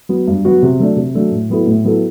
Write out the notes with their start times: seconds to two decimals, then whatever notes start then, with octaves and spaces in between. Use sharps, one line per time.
0.09 F#3 B3 F#4
0.28 G2
0.45 F#3 B3 F#4
0.63 C3
0.80 F#3 A3 D4
0.96 C3
1.14 F#3 A3 D4
1.31 A2
1.50 F#3 B3 E4 A4
1.67 A2
1.85 F#3 B3 E4 A4